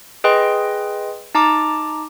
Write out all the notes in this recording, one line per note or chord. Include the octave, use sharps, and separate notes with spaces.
G#4 B4 D#5 G5 C6
D#4 A5 A#5 D6